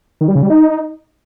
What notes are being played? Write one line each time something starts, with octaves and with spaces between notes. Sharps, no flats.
D#3
G3
C#3
G3
D#4